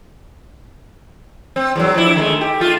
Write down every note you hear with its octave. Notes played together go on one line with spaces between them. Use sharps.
C4
E2 G#2 F#3
F3 D4 E4
D#3 G#3 A3
G4
A3 F4